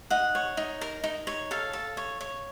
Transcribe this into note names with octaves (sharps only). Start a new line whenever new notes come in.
D#4 F#5
C#5
D#4
A#4
D#4
C#5
A4 F5
A4
C#5
C#5